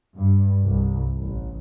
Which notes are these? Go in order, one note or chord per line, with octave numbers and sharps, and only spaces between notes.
G2
C2
A1